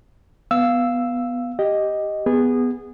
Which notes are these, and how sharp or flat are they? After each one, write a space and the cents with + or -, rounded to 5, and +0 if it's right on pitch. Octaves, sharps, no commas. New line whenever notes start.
B3 +0 F5 -5 E6 +0
G4 +0 D#5 +0
B3 +0 G#4 -20